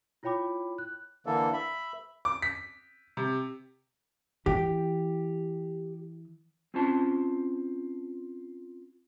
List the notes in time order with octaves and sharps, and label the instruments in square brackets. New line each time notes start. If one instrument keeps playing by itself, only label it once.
[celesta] E4 F4 C#5 G5 B5 D6
F#6
[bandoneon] D3 E3 A#3 A4
E5 B5
[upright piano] D6
B6
C3
[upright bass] E3 [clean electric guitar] G4 G5
[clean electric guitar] C4 C#4 F4 C5 A5